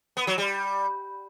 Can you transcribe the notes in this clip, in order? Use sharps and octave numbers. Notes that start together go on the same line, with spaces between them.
B3
F#3
G3